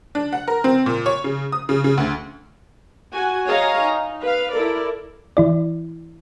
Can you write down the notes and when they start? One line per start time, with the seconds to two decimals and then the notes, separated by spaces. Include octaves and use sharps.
0.15 D4
0.33 F#5
0.48 A#4
0.64 C4
0.86 A#2
1.06 C#5
1.24 C#3
1.52 D#6
1.69 C#3
1.84 C#3
1.98 D2
3.13 F#4 G#5
3.47 G#4 C#5 D#5 F5 G#5 A#5
3.81 D#4
4.23 B4 F5
4.53 E4 A4 A#4 D5
5.37 E3 E4 D5